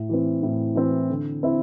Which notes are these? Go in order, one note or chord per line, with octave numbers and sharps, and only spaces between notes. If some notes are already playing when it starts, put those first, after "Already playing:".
Already playing: A2
E3 C4
A2
E3 C4
D3
C4 E4